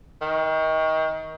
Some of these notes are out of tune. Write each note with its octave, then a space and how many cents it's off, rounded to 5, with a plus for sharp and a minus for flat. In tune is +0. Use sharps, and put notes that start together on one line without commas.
D#3 +30